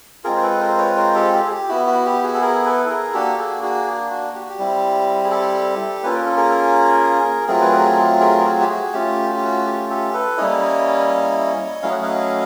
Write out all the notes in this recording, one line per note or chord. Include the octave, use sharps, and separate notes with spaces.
G#3 C4 F4 G#4 A#4
C5
A4 B4
A#4 C5
B4 C#5
A#4 C5
G4 A4
G4
G#4
G4
B3 E4 F#4
F#4
G4
F#4 G#4
A4
G#4 A#4
A4 B4
A4
G#4 A#4
A#3 D4 F#4 G4 A4
F#4 G#4
F#4 G#4
F#4
G4
F#4
G4
G3 C4 E4
G#4
G4 A4
A#3 C#4 F4 B4
A#4
A4
G#4 A#4
F#3 A3 C4 F4 G#4 A#4
B4
G#4 A#4
G#4 A#4
F#4 G#4
G4
F#4 G#4
A3 C#4 F4 G4
F#4
G4
F#4
G4
G4 A4
A4 B4
G3 A#3 C#4 E4 C#5 D#5
F#3 A3 C#4 E4 F5
F#5
D#5 F5